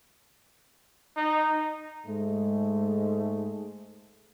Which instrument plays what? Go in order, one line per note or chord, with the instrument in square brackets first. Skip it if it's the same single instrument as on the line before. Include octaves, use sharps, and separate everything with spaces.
[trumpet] D#4
[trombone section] G#2 G#3 A3